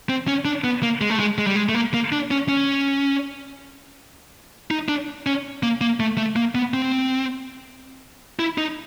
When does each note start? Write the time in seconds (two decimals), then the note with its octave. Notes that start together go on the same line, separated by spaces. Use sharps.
0.09 C4
0.28 C#4
0.45 D4
0.64 B3
0.83 A#3
1.01 G#3
1.10 A3
1.20 G#3
1.38 G#3
1.47 G3
1.56 G#3
1.69 A3
1.75 A#3
1.94 A#3
2.12 D4
2.31 C#4
2.49 C#4
4.71 D#4
4.88 D4
5.26 C#4
5.63 A#3
5.81 A#3
6.00 A3
6.18 A3
6.36 A#3
6.55 B3
6.74 C4
8.39 E4
8.58 D#4